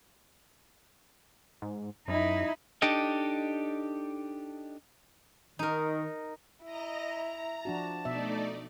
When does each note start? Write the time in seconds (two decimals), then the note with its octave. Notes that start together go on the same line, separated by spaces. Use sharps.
1.62 G#2
2.08 F#2 D#4 E4
2.82 D4 D#4 G4 A4 D#5
5.59 D#3 D#4 A#4
6.65 E4 D#5 A#5 A#6
7.10 A#5
7.65 F3 D4 F#4 A5
8.05 B2 A3 D#4 D5 E5